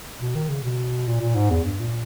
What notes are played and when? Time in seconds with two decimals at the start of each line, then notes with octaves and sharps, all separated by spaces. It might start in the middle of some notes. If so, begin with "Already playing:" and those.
0.20 B2
0.35 D#3
0.49 C#3
0.63 B2
1.07 A#2
1.21 A#2
1.35 G#2
1.50 E2
1.64 G2
1.80 A#2